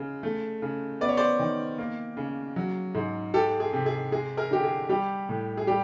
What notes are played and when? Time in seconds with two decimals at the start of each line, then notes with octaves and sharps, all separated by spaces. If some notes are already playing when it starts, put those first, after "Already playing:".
Already playing: C#3 G#3
0.23 A3
0.62 C#3
1.01 B3 D5
1.09 C#5
1.17 C5 D5
1.39 D#3
1.78 A#3
2.17 C#3
2.56 F#3
2.95 G#2
3.34 G#3 G4 A4
3.60 G#4
3.73 C3
3.86 G#4
4.12 G#3 G#4
4.37 G#4 A#4
4.51 D3 G4
4.64 G#4
4.89 G3 G4
5.29 A2
5.57 G#4
5.67 G3 G4